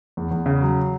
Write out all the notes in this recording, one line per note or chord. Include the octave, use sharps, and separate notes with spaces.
E2
E2
C#3
F#3